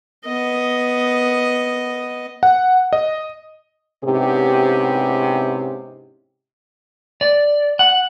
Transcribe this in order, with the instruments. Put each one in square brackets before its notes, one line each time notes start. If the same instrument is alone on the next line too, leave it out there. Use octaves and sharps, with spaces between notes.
[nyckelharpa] B3 D#5
[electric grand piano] F#5
D#5
[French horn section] G#2 C3 B3 C#4 E4 G4
[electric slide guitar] D5
F#5